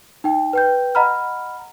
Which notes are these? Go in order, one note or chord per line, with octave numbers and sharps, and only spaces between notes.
D#4 G5
B4 G5 G6
D#5 F#5 A#5 B5 F6